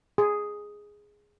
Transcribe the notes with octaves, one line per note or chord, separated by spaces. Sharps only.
G#4